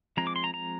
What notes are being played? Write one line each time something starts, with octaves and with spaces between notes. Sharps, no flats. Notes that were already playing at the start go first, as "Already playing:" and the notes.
F3 G#3 C4 A#5
D6
C6
A#5
A#5